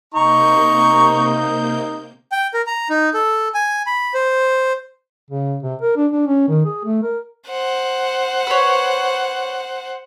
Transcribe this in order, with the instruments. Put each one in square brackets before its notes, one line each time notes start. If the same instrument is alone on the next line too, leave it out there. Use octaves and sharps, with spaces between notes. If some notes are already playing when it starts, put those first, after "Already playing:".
[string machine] C3 A#3 G6 [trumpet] D#4 [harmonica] A#5 C#6
[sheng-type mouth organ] G5
A#4
A#5
D#4
A4
G#5
B5
C5
[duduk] C#3
C3
A#4
D4
D4
C#4
D#3
G#4
A3
A#4
[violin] C5 F#5
[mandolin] B4 C#5